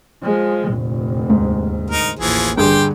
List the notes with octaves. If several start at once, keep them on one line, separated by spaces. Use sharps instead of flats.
F3 G#3
F1 D2 A#2
D#2 G#2
D#4 A#4
A1 D#2 A2 E3 F3 G#4
G2 D3 G4 G#4 G5 C6